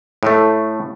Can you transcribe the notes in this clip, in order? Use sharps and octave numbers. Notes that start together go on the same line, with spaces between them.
A2 A3